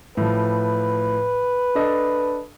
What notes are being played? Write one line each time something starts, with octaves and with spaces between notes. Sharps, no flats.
A2 F3 B4
D4 A4 D#5